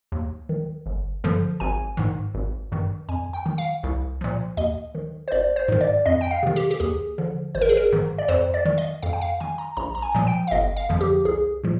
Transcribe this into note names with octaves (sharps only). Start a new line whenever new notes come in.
D#2
D#3
G1
G2 D3 F3
G#1 G#5
G#2 D#3
G#1
G2 D#3
F2 G#5
G5
D#3
F5
C2
A#2 F3
D#2 D#5
D#3
C5
G#1 D5
C5
G#2 D#3
D5
F2 D#5
G5
F5
C3 D#3
G4
G4
D#2 G#4
D3 F3
G#1 C5
A#4
G#4
A#4
G#2 D#3
D5
F2 C5
D5
D#3
D#5
F2 F5
G5
F5
D#3 G#5
A#5
A#1 A#5
A#5
G#5
A#2 F3
G5
F5
G1 D#5
F5
F2 D3 F3
G4
C2 G#4
A#2 F3